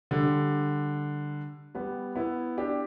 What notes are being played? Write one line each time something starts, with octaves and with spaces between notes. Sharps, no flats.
D3 G3
G3 B3
B3 E4
D4 G4